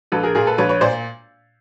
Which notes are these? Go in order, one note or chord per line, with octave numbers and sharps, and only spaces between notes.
A#1 A4 B4
G#4 A#4
A#2 G#4 A#4
A4 B4
A#1 B4 C#5
B4 C#5
A#2 C5 D5